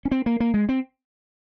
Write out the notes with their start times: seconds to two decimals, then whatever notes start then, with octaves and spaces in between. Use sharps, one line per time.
0.05 C#4
0.11 C4
0.26 A#3
0.40 A#3
0.54 G#3
0.69 C4